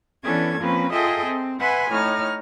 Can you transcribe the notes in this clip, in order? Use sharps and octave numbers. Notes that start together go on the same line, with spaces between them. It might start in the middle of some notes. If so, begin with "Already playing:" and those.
E3 B3 C#4 D4 A4 G#6
F3 A#3 C4 C#4 B4
F4 G#4 A4 D#5 E5 G5
C4
B4 E5 F#5 G#5 B5 C6
A2 D#4 C#5 F6